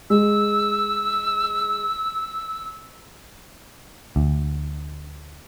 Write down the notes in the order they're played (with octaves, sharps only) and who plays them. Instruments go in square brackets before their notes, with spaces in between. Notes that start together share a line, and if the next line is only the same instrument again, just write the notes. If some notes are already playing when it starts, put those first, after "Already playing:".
[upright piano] G#3 [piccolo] E6
[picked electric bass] D2